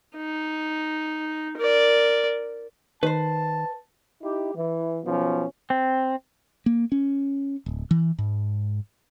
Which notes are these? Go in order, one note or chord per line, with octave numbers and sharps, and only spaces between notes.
D#4
A#4 D5
D#3 B4 C5 A5
D#4 E4 G4
E3
B1 B2 F3 C#4
C4
A#3
C#4
D1
E3
G#2